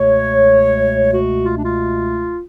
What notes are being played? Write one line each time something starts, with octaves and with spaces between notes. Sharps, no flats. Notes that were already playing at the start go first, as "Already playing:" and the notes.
Already playing: C#2 B2 A3 C#5
F#4
F4
D4
F4